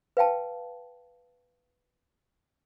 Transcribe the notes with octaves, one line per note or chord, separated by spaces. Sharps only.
B4 F5 G5 A5